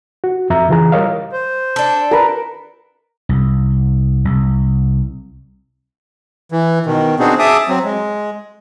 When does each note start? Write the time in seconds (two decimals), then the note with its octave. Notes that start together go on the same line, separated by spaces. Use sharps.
0.24 F#4
0.50 F2 E5 A#5
0.69 C#3 E3 F4 G#4 A#5
0.92 G3 A#4 C#5 D#5 F5
1.33 C5
1.76 D4 A4
2.11 A#4 B4
3.29 C2
4.25 C2
6.52 E3
6.86 B2 D#3
7.19 B3 C4 D4 D#4 F#4 G#4
7.39 G#4 E5 A5 D6 D#6
7.69 F#3 C4
7.84 G#3